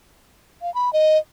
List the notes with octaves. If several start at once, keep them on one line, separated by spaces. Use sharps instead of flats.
F5
B5
D#5